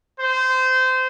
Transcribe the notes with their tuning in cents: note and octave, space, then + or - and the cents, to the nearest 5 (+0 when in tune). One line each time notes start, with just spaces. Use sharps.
C5 -20